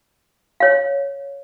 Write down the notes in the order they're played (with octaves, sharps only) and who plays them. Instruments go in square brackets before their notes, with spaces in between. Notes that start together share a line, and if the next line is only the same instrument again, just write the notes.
[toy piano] C#5 F5